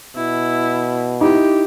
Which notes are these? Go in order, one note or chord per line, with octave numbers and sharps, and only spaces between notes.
B2 E4
D#4 E4 G4